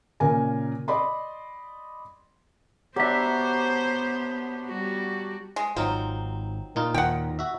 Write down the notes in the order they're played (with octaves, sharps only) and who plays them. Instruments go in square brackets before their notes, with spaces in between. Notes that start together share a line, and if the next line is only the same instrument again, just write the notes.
[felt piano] A#2 C#3 A#4 G#5
D5 D#5 B5 C6
[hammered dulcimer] F#3 D4 [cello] B3 [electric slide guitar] G4 E5 [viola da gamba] C5
[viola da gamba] G3 F#4
[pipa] G#3
[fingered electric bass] G#1 [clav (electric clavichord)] F#3 D#4 F4 [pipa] C4
[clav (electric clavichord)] A#2 D#4 F4
[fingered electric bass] D#2 D#3 [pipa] F#5 G5
[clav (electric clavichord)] F#4 E5